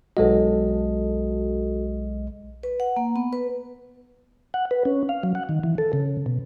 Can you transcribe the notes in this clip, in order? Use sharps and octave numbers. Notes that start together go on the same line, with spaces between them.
B1 G#3 F#4 A4 D#5
B4
F#5
A#3
B3
B4
F#5
B4
C#4
F5
F#3
F#5
D#3
E3
A4
C#3
B2